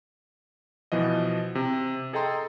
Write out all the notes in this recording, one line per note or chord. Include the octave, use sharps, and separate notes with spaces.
B2 E3 F3 D#5
C3
G#4 A4 D#5 G5 A#5 C6